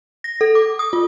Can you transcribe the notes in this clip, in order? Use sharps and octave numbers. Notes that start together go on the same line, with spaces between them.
A#6
A4
D6
D#6
F4